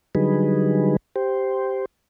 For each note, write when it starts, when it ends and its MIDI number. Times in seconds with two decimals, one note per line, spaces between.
0.15 0.96 50
0.15 0.96 54
0.15 0.96 55
0.15 0.96 63
0.15 0.96 68
0.15 0.96 71
1.16 1.86 67
1.16 1.86 72